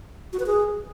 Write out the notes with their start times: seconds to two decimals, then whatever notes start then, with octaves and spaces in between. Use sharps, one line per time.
0.33 F#4
0.40 B4
0.46 G#4